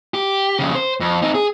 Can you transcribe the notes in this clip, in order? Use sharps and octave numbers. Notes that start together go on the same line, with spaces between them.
G4
F2 C#3
C5
F2
C4 D#4
G#4